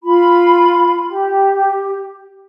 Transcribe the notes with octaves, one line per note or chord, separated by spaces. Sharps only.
F4 B5
G4